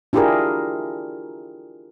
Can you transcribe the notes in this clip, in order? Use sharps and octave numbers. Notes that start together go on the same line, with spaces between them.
D4 E4 F4 G4 G#4 A#4